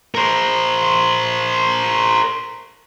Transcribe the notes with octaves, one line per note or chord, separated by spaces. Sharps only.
A#4 C5